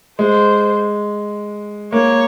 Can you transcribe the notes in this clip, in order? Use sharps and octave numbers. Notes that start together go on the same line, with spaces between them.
G#3 C5
A#3 C#5